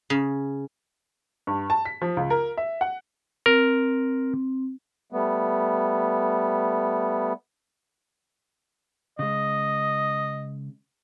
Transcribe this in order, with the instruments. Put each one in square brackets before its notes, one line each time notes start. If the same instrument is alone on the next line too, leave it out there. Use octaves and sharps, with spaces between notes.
[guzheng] C#3
[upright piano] G2
A5
B6
F3
C#2
A#4
E5
F#5
[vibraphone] C4 [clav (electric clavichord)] A#4
[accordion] G3 A3 B3
[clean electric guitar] C#3 G#3 [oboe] D#5